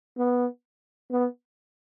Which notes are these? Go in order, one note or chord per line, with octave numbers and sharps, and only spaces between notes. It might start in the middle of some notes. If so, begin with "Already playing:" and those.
B3
B3